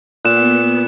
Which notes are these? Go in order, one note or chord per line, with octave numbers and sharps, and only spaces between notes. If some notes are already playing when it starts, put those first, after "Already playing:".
A#2 B3 F#6 E7